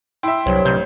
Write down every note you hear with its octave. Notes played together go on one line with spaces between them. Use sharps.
E4 E5 G5 C6
C2 G2 F#3 C5 C#5
A1 C3 G6